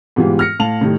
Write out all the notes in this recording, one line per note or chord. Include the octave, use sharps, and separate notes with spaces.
G#2 B2 E3 G3 F4 G4
F6 A#6 C#7
A2 F5 A5 F7 F#7
A2 D#3 G3